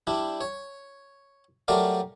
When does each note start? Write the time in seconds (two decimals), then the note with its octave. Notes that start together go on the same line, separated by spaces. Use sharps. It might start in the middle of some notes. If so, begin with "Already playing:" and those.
0.07 G3 D4 E4
0.41 C#5
1.68 F#3 G3 A3 A#4 D5 F5